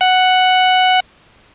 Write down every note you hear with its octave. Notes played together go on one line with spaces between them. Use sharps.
F#5